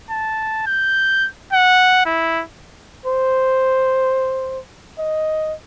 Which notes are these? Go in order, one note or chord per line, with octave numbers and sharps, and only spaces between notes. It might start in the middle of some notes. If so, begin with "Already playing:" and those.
A5
G6
F#5
E4
C5
D#5